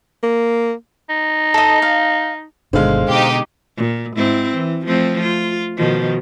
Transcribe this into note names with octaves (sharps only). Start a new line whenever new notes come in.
A#3
D#4
A4 D#5
F5
G1 B2 D3 D#3 G#3 C5 F5
B2 D#4 G4
A#2
G#2 C4 E4
E3
F3 A3 C4
F4
B2 D#3 F3